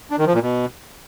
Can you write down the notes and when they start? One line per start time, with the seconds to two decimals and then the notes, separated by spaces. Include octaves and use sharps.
0.11 D4
0.19 D#3
0.26 F3
0.34 A#2
0.42 B2